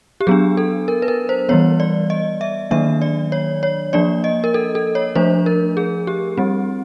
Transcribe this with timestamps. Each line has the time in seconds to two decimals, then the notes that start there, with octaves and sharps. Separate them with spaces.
0.21 G4
0.27 F#3 B3 D4 G#4
0.57 A4
0.88 A#4
1.02 B4
1.08 A#4
1.29 C5
1.49 E3 G3 B3 C#5
1.80 D5
2.10 D#5
2.41 E5
2.71 D#3 F#3 A#3 D4 E5
3.02 D5
3.32 C#5
3.63 C#5
3.93 F3 A#3 D4 D5
4.24 D#5
4.44 A#4
4.54 A4
4.75 A4
4.95 C#5
5.15 F3 A3 D4 C5
5.46 A#4
5.77 G#4
6.07 G4
6.38 G3 C4